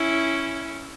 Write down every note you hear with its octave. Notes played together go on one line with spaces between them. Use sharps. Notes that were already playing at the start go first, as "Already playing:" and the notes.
Already playing: C#4 E4